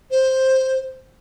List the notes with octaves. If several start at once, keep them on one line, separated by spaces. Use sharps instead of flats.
C5